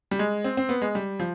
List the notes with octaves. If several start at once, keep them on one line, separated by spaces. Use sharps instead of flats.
G3
G#3
C4
C4
B3
G#3
G3
F3